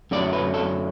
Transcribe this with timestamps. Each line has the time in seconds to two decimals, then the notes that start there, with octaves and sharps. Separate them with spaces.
0.11 F#2 D3 F#3 A3 D5
0.33 B4
0.54 A4